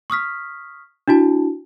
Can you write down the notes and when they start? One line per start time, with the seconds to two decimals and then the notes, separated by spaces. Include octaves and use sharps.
0.10 C#6 D#6 F6 B6
1.08 D4 E4 F#4 A5